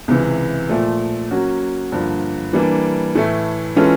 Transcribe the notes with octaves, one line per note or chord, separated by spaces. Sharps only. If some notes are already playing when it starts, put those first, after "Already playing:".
C#2 C3 E3
A#2 F3 A3
F#3 A#3 C#4 F#4
G2 D3 F3 A#3
E3 G3 A#3 D4
A2 E3 A3
E3 G#3 C#4 F4 A4